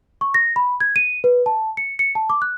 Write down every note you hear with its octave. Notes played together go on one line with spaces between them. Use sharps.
C#6
A#6
B5
G#6
D#7
B4
A5
C#7
C#7
A5
D6
F#6